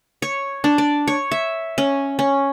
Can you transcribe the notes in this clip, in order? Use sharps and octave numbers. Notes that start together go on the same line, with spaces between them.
C#5
D4
D5
C#5
E5
C#4
C#4